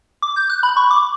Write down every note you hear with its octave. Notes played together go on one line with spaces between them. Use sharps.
D6
G6
F#6
B5
C#6
D6